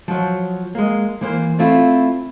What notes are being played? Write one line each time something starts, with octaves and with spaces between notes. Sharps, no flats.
F3 F#3
G#3 A#3
E3 A#3 C5
A3 C4 E4 F4